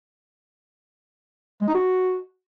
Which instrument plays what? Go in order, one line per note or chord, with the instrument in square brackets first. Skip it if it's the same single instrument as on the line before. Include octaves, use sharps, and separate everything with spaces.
[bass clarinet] G#3
D#4
F#4